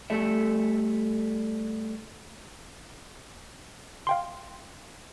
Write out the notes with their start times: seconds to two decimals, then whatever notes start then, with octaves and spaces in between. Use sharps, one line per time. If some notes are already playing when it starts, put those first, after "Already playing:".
0.10 G3 A3 A4 E5
4.07 F5 G5 C6